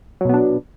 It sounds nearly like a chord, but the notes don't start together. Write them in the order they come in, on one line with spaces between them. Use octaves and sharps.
F#3 B2 B3 D4